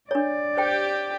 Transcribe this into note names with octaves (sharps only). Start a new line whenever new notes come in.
D4 C#5 D5
G4 C5 G5